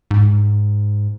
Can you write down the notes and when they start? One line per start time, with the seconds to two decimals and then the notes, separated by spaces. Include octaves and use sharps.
0.11 G#2